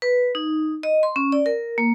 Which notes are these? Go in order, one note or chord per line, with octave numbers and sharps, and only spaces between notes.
B4
D#4
D#5
C6
C#4
D5
A#4
A#3